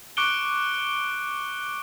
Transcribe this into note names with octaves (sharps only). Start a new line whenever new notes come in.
C#6 D6 F#6 C#7 D7 G7